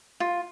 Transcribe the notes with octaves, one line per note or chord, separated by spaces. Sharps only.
F4